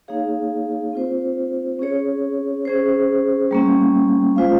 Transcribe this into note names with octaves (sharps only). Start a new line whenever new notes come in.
A#3 D#4 G#4 C#5 F5
C4 F4 C5
C#4 G#4 C#5
C#4 G#4 C5
G3 A#3 C#4
G#3 C#4 F4 C5 F5